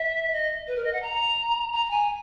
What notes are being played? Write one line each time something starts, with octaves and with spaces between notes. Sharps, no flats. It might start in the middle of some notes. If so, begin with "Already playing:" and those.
Already playing: E5
D#5
B4
A#4
D#5
F#5
A#5
A#5
G#5